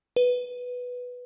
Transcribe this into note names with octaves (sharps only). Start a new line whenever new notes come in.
B4